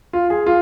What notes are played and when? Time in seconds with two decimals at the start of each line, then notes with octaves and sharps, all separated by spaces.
0.13 F4
0.30 G#4
0.46 F4